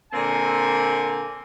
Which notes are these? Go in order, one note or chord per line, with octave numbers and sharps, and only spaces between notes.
A#2 D3 A#3 C4 G#5